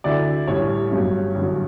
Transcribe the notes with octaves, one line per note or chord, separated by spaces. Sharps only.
D2 D3 A3 E4 D5
A1 A2 G3 C#5
G1 G2 F#3 C#4
A1 G2 D3 F#3